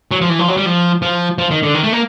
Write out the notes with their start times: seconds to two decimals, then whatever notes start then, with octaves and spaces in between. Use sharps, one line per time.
0.11 F#3
0.21 F3
0.30 E3
0.39 F3
0.48 F#3
0.57 G3
0.66 F3
1.02 F3
1.38 F3
1.51 D#3
1.63 D3
1.75 D#3
1.83 A3
1.93 A#3